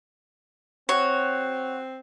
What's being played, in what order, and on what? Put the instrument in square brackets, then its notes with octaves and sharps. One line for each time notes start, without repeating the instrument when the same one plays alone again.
[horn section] C4 [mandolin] F#4 [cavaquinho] C#5